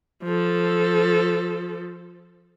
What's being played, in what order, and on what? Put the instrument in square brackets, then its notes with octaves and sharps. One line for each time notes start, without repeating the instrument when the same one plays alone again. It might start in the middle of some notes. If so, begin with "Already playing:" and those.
[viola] F3 A4